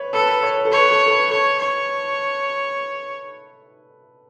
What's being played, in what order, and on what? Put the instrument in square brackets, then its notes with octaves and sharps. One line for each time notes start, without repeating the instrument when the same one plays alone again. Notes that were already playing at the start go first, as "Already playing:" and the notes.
Already playing: [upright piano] B4 C#5
[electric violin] A4 [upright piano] B4
[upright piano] B4
C#5
B4
A4
[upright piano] B4 [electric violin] C#5
[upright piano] A4
A4
B4
[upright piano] A4 [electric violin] C#5
[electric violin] C#5